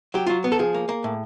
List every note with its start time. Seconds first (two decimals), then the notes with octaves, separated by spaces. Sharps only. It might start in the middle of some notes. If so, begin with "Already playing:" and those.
0.14 F#3 G4
0.27 F#3 F4
0.44 B3
0.52 A4
0.59 F3 G#4
0.74 A#3
0.89 A#3
1.04 A2